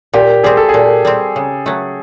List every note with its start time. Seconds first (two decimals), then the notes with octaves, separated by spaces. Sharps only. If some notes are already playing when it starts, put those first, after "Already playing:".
0.14 A#2 G4
0.44 G3 C4 G#4
0.57 A4
0.69 G#4
0.74 A#2
1.05 G3 C4
1.36 C#3
1.66 F#3 A3